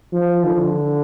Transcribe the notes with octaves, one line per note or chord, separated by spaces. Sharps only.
F3
D3